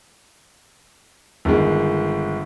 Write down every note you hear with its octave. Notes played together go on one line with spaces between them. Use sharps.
G1 D#3 G#3